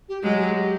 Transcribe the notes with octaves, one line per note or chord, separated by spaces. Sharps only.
G4
F#3 G#3 G#4
G4
G#4
G4